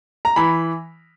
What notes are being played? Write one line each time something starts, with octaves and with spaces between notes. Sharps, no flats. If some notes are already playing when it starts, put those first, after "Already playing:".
A#5
E3 B5